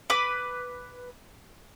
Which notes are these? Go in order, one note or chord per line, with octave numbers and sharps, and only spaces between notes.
B4 D6